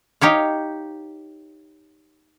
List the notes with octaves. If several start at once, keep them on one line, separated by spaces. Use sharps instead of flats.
D#4 G4 C#5 F5